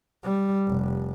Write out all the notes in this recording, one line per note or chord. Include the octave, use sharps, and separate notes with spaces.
G3
F1